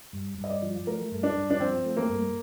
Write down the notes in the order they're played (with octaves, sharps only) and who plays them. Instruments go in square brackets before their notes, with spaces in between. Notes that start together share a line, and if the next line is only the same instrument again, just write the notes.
[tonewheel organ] G2
G2
[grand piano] D#5
D5
[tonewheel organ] F3
[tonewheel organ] A3 [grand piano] A#4
[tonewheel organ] G2
[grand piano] D4
[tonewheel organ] G2
[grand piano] D4
[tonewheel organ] F3 [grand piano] C4
[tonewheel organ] A3
[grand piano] A#3
[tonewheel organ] G2